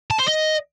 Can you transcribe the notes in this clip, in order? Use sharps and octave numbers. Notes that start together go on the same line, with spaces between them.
A5
C5
D#5